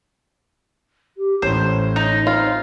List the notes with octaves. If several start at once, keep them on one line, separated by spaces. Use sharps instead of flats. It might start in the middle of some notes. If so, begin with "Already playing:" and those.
G4
A1 A2 C5 C#5
D#4
C4 F4